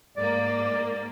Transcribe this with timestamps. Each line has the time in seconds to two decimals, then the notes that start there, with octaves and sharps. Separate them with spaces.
0.17 G#2 A#3 D5